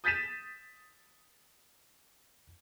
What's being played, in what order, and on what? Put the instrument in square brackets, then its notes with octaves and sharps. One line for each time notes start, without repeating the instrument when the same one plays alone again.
[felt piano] D#6 G6 A6 B6 D#7 E7